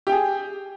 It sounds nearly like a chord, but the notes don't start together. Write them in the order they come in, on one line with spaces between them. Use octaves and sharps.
G4 G5 G#4